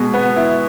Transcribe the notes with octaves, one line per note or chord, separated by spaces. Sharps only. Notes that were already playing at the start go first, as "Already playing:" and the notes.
Already playing: B2 G#3
B3
E4